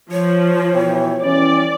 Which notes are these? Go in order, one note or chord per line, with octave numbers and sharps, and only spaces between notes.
F3 C#5
B2 E3 G5
E3 G3 C#4 D5